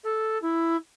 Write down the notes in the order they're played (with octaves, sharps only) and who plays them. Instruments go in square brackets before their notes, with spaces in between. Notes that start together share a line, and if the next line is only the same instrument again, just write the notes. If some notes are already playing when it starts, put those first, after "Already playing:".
[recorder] A4
E4